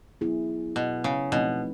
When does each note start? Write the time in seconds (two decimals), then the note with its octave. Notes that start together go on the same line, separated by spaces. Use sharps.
0.21 F#3 B3 E4 G#4
0.76 B2
1.04 C#3
1.32 B2 F3 A3 C4 D#4